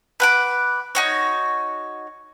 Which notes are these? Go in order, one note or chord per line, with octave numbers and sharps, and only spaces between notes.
B4 F#5 D6
D#4 F#4 C#5